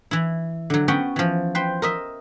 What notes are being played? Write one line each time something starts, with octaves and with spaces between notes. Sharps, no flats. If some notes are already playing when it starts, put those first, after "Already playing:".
E3 E4
D3 F#3
B3 C#4 F#4 G5
E3 F3
B4 C5 G5
A#4 D#5 E5